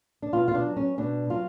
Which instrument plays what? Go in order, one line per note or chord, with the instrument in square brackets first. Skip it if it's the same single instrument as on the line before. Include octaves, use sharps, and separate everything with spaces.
[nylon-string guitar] D4
B2 F4
F4
D4
F#3
C#4
B2 D4
F#3 F4